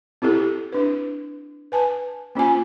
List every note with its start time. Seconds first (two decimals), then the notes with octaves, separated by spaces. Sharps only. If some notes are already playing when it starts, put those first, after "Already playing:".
0.22 C4 E4 G4 A4
0.72 D4 B4
1.72 B4 G#5 A5
2.35 A#3 C#4 F4 G#5